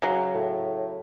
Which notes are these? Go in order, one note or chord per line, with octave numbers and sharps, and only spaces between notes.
C#3 F#3
A2